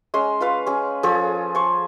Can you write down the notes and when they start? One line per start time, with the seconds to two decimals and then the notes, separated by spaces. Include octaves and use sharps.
0.14 G#3 C#4 C6
0.40 F4 B4 F5
0.67 C#4 G#4
1.03 F3 G#4 A4 C#5
1.55 C5 C#6